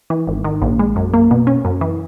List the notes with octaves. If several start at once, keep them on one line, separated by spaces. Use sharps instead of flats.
E3
G#1
D#3
A#1
G#3
F#2
A#3
B2
C#4
F#2
E3